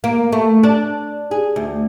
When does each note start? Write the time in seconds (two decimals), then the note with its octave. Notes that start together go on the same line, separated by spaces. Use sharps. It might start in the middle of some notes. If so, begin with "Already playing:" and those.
0.04 A#3
0.32 A3
0.63 D4
1.31 G#4
1.56 D2